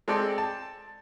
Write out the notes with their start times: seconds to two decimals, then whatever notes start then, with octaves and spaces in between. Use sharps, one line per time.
0.08 G#3 C4 A4 D5 G5 C6
0.38 A5